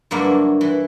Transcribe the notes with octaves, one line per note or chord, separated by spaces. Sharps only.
G2 D3 F#3 A#3 E4
E3